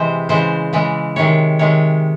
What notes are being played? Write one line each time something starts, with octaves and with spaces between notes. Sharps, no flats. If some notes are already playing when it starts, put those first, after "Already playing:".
Already playing: C3 E3 G#3 C5
C#3 E3 G#3 C5
C#3 E3 G#3
C3 D#3 G#3 C#5
C3 D#3 G#3 C#5